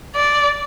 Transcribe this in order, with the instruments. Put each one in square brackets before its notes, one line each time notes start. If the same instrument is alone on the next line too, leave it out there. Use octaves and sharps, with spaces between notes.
[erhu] D5